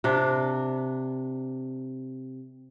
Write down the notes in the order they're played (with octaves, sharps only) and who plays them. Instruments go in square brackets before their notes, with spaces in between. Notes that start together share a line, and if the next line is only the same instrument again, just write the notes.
[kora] C3 D4